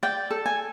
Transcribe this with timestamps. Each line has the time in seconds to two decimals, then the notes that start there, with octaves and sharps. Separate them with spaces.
0.03 D5 G5
0.31 A4
0.46 G#5